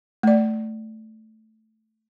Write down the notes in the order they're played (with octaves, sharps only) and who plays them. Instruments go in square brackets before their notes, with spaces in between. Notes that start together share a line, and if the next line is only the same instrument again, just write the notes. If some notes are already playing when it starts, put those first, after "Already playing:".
[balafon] A3 D5